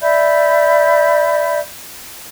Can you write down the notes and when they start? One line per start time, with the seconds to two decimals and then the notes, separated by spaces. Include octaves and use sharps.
0.01 D5 E5 B5 G6